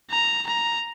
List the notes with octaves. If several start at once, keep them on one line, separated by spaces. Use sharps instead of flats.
A#5
A#5